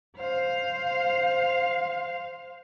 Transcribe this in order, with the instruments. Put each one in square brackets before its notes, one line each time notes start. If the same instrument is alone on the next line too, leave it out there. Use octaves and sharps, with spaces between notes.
[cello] C5 F5